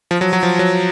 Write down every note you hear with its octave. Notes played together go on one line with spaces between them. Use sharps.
F3
F#3
F#3
F3
F#3